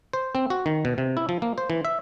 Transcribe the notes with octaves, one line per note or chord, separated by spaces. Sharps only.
C5
C4
F#4
D#3
B2
C3
E4
F3
A#3
C5
E3
E5